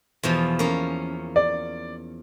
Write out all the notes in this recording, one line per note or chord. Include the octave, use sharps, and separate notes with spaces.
E2 B2 F3
A#3 C#4
D5